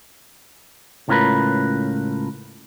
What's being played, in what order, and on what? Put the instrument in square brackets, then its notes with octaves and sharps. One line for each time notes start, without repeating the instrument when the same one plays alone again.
[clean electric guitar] C#2 A2 C#4 F4 A#4 B4